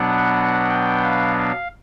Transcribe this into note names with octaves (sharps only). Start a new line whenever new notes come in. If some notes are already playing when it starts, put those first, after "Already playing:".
Already playing: B2 F#3 B3 D4 F#5
G5
F5
F5